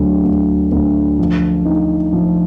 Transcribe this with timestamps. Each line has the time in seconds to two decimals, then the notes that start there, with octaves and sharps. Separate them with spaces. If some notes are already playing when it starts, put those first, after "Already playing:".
Already playing: D2 F#3
0.24 D2
0.72 D2
1.19 F3
1.65 D#4
2.13 F3